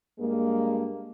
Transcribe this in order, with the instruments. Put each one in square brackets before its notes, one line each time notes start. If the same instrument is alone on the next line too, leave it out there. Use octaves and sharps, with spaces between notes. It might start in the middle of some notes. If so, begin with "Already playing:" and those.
[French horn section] G2 G#3 A#3